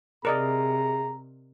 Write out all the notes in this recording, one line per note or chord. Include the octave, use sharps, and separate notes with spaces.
C3 G#4 A#4 D5 D#5 A#5